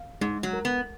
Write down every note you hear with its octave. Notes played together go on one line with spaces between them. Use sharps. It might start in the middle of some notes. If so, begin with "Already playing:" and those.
Already playing: F5
G#2 G#3
F#3
A#4
B3